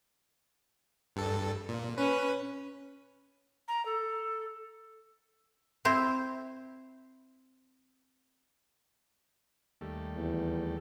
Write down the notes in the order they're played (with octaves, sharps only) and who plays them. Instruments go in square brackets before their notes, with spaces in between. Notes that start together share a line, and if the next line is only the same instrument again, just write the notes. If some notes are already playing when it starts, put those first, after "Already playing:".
[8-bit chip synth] G2 A4
A#2
[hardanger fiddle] C#4 [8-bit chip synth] B4
[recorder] A#5
A4
[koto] C4 E4 C5
[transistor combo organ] D#2 G3 A3
[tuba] E2